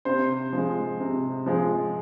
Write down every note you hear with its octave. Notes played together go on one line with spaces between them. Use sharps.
C3 C5
F3 G#3
C3
F3 G#3